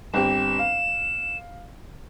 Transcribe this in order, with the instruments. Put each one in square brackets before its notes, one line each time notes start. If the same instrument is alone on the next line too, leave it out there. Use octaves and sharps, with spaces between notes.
[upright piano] G1 C4 G4 [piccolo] E7
[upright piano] F5